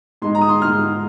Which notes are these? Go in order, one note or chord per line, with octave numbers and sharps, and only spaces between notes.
G#2 G#3 D#4 C6
A#5
D#6
C6
G#2 G#3 D#4 F6